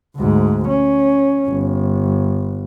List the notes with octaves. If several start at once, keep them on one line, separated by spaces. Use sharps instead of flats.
D2 G#2
C#4
G1